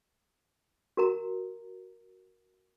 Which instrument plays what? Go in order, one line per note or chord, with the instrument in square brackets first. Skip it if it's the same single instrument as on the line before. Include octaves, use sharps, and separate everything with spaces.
[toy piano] F#4 A#4 A#5